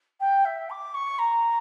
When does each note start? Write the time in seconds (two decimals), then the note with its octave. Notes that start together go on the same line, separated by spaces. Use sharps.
0.20 G5
0.45 E5
0.70 D6
0.94 C#6
1.19 A#5